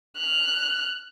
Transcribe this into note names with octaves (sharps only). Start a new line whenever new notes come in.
F6 F#6